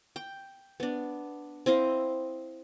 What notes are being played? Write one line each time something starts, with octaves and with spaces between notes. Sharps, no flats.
G5
B3 D4
C4 E4 D#5 F5